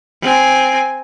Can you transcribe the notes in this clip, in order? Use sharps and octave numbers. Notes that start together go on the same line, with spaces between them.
C4 G#5